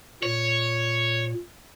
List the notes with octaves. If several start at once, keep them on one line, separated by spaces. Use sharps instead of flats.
A#2 C#5